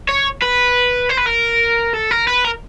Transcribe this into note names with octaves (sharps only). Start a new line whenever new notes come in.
C#5
B4
C5
B4
A#4
A4
A#4
B4
A#4